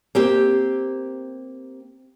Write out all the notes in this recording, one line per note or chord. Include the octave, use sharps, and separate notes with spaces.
A#3 C4 G4